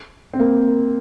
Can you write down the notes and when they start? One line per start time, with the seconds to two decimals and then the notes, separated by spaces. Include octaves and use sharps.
0.33 C4
0.40 A#3